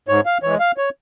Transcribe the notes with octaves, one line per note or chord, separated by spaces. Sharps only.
G#2 C#5
F5
E3 G#3 C#5
F5
C#5